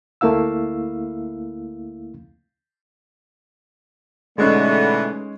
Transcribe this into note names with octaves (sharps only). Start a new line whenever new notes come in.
D2 A3 A#3 E4 F5 E6
B2 D3 E3 G#3 A3 C#4 D#4